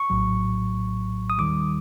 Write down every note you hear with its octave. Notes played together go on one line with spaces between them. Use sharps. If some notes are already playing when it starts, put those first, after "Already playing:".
Already playing: C#6
A#1 A2 F#3
D#6
D#2 D#3 G3 D6